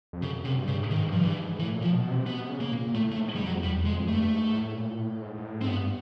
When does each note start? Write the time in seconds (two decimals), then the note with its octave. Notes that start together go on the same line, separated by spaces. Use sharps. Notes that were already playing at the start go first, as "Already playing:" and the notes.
0.13 F2
0.22 F#2 C#3
0.40 F#2 C3
0.57 G2
0.67 C#3
0.74 G2
0.83 A2
0.91 G#2 D#3
1.07 G2 F3
1.24 G2 E3
1.41 G#2
1.58 A2 E3
1.76 A#2
1.82 F3
1.93 B2
2.10 C3
2.26 B2 B3
2.45 C3
2.49 C#3
2.61 A#3
2.72 A#2
2.88 A#2
2.95 A2 A3
3.12 A3
3.17 G#2
3.35 G3
3.41 F2
3.46 F#3
3.52 F2
3.63 E2 G3
3.85 F2 G#3
4.08 G2 A3
4.31 G#2
4.48 G#2
4.54 A2
4.76 A#2
4.98 A2
5.22 G#2
5.35 G#2
5.44 A2
5.61 G#2 C4
5.67 G2 B3